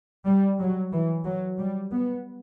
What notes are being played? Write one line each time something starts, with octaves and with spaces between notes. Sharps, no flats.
G3
F#3
E3
F#3
G3
B3